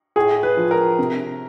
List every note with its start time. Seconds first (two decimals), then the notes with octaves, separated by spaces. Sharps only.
0.16 A2 G#4
0.43 B4
0.57 F3
0.71 A#4
0.99 C3